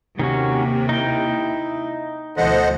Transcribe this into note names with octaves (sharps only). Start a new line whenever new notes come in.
D#2 C3 D#3 A#3 C#4 F#4 G4
D#4 E4 G5
D2 B2 E3 A4 C5 D#5 F#5